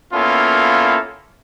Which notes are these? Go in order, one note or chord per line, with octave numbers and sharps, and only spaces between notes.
A#3 B3 C#4 E4 F4 A4